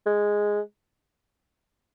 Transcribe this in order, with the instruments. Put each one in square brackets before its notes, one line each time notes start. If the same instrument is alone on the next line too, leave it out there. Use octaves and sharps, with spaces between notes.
[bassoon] G#3